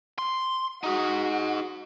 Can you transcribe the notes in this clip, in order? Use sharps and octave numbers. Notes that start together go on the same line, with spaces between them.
C6
D#4 F#4 G#4